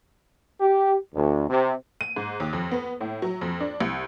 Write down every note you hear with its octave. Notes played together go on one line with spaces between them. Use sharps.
G4
D2
C3
D#7
G#2
D#2
F2
B3
A2
F#3
F2
D4
C2